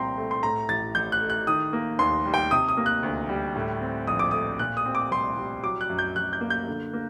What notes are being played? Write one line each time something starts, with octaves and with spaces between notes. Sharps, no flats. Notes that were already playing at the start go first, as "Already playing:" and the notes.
Already playing: C2 A#2 C4 G5 A#5 C6
A3
C6
A2 A#5
A1 A6
A1 G6
F#6
A3
F#6
D#3 D#6
A#3
D#2 C6
G3
G5
C3 D#6
D#6
A#3
F#6
D2
G3
A2
C4
A#1 D#6
D6
A3 D#6
A#2 F#6
D#6
C4
D6
C2 C6
G3
F#3 D6
F#6
F#2
G6
F#2 F#6
G6
A#3
G6
D3
A#3